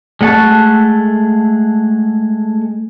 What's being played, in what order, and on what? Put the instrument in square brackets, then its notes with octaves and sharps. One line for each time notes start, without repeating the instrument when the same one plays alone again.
[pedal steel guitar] G#3 A3 F#5 A5 C#6